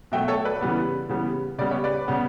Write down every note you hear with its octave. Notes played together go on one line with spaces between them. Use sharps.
B2 F#3 A3 E5 G5
A4 C#5
B4 D5
C#3 E3 G3 B3
C#3 E3 G3 B3
C#3 G3 B3 D5
C#5
B4 D5
C#3 G3 B3